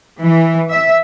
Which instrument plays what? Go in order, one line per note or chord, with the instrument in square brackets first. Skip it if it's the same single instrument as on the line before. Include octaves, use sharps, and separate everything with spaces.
[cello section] E3
E5